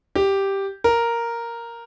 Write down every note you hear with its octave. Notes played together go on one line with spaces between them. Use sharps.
G4
A#4